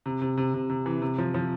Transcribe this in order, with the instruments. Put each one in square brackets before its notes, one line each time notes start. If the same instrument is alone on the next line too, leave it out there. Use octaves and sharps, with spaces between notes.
[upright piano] C3
C3
C3
C3
C3
E3
C3
F3
F3